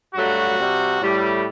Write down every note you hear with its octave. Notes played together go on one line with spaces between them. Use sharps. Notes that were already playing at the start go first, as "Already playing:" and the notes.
G2 F#3 A3 F#4
C3 G3
A2 G3